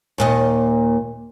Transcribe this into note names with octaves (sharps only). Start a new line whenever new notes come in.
D#2 A#2 D#5